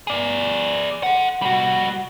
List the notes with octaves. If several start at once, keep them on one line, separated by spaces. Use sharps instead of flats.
G#4 D5
A4 F#5
G3 F#4